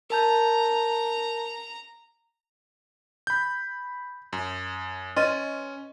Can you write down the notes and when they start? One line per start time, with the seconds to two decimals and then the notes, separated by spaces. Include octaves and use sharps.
0.10 A#4 A5 A#5 G6
3.27 B5 G6
4.33 F#2
5.16 C#4 B4 D#5 C6 D#7